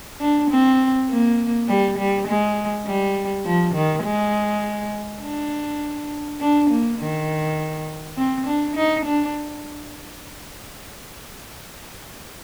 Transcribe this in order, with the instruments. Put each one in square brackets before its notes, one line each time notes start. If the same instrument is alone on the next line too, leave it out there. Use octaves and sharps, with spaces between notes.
[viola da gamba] D4
C4
A#3
G3
G3
G#3
G3
F3
D#3
G#3
D4
D4
A#3
D#3
C4
D4
D#4
D4